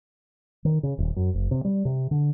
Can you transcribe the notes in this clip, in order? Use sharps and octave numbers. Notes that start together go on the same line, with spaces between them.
D#3
C#3
D#1
F#2
F#1
C3
G3
C3
D3